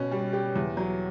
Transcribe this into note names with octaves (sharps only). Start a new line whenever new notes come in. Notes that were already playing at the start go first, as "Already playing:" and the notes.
Already playing: B2 C#4
G3
G4
E2
F#3